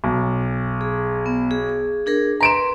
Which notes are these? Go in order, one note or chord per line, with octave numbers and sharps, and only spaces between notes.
B1
G#4
B3
G#4
D4 G#4 A#4
B4 A#5 C6 D7 E7